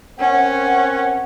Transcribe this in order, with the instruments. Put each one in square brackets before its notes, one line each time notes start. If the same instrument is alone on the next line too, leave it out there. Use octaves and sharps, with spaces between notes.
[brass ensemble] C4 A#4 F#5 [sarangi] C#4